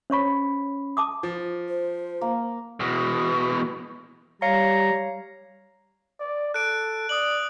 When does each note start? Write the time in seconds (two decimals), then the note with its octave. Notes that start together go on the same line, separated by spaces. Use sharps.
0.10 C#4 C5 C#5 B5 C#6
0.97 A5 D6 D#6
1.23 F3
1.69 C5
2.21 A#3
2.80 E2 B2
4.42 G3 C#5 F5 A#5 C#7
6.20 D5
6.54 A4 F#6 D7
7.09 D5 D#6 F#7